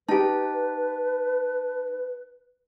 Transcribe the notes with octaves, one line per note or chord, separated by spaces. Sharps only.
D#4 G4 B4 A5